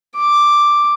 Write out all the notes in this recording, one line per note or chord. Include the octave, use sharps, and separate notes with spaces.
D6